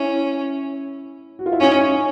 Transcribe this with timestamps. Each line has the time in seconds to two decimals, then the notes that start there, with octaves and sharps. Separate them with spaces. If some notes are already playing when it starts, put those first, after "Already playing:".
Already playing: C#4 E4
1.39 F#4
1.46 F4
1.53 E4
1.60 C#4 D#4